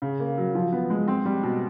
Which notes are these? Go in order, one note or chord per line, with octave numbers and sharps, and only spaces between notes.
C#3
A#3
F#3
F3
B3
G#3
C4
G3
B2